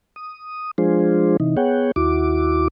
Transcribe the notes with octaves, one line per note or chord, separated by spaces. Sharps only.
D#6
F3 G#3 D4 F4 G#4 C5
C3 E3 D#4
B3 G#4 C#5 F#5 G5
D#2 E4 F#4 D6